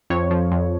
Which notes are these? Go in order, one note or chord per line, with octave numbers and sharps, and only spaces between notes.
F2 C#5
F3
F2